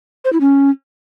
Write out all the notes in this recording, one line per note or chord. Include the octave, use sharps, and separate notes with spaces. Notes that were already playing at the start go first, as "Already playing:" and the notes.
C5
E4
C#4